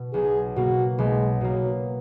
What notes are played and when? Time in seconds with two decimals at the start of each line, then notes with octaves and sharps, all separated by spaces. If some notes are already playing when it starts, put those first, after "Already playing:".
Already playing: B2
0.13 B1 G#4
0.56 B2 A#3 F#4
0.98 B1 G#3
1.41 B2 F#3 A#3